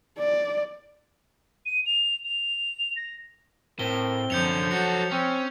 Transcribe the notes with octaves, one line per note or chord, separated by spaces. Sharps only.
D5
D#7
F7
F7
A#6
A2 C4 A#4 G7
F#2 D3 F3 G6 C#7 F7
F#3 F#4 A4 C#7
C4 C#4